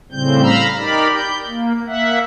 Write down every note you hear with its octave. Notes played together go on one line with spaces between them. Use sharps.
A2 C#3 G3 C4 G6
F5 A#5 B5 E6 F6
D#4 G4 A#4 D5 B5
G6
A#3
A#3 E5 F#5